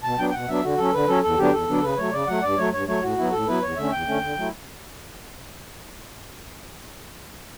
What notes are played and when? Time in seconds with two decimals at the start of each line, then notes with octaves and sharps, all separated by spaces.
0.03 B2 A5
0.18 F#3 B3 D4 G5
0.29 G5
0.33 B2 F#5
0.48 F#3 B3 D4 E5
0.62 D3 F#4
0.78 F#3 C#4 A4
0.93 D3 B4
1.08 F#3 C#4 A4
1.23 E2 A4
1.38 D3 F#3 B3 D4 G4
1.53 E2 A4
1.68 D3 F#3 B3 D4
1.82 C#3 B4
1.98 F#3 A3 C#5
2.12 C#3 D5
2.27 F#3 A3 F#5
2.42 G2 D5
2.57 F#3 A3 C#5
2.72 G2 C#5
2.87 F#3 A3 C#5
3.02 A2 F#4
3.17 F#3 B3 E4
3.32 A2 A4
3.47 F#3 B3 E4 B4
3.62 E2 C#5
3.76 D3 A3 C#4 E5
3.92 E2 G5
4.06 D3 A3 C#4
4.22 D3
4.37 F#3 A3 E4